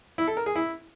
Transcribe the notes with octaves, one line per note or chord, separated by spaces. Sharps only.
E4
A4
A#4
G#4
E4